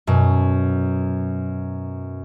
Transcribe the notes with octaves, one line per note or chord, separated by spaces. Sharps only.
F#2 B2